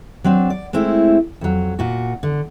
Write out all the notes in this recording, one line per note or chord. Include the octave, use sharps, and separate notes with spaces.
F#3 C4 D4
D5
G#3 A3 C4 E4
F2 F#3
A#2 F#4
D3